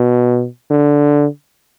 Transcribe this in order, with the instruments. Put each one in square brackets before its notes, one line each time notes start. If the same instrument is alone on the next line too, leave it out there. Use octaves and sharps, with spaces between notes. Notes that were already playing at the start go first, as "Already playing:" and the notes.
Already playing: [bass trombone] B2
D3